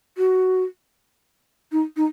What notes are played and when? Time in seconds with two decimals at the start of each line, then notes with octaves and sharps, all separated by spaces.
0.18 F#4
1.72 D#4
1.97 D#4